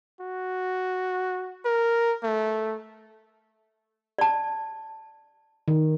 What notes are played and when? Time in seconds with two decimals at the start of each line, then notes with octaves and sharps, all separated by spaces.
0.20 F#4
1.65 A#4
2.23 A3
4.18 D5 A5
5.68 D#3